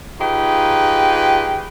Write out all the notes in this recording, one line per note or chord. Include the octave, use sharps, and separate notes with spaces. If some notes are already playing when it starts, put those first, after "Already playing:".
D#4 F4 G4 G#4 B4